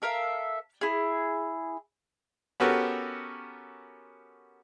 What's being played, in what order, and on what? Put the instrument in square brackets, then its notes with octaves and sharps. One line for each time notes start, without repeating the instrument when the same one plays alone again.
[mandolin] A4 A#4 E5 F5
E4 G#4
[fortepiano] B3 C#4 F#4 G4 A4 A#4